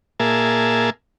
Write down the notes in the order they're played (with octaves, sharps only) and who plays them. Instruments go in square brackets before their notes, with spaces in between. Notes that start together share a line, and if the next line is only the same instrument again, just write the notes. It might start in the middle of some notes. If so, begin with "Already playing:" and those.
[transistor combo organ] A#2 A#3 G#4 E5 A5